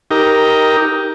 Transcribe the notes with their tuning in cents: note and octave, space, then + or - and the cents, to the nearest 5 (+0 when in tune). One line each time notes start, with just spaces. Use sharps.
D#4 +15 G4 +0 A#4 +0